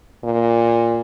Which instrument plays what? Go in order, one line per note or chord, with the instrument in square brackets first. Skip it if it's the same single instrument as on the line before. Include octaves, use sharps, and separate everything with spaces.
[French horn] A#2